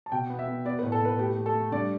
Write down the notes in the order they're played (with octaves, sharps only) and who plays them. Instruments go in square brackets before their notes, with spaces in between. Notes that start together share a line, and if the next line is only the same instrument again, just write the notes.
[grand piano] A5
B2 G5
B3
E5
B3
B3 D5
B4
A2
A4
A2 B4
A3 G4
A3
A4
A3
G2 D5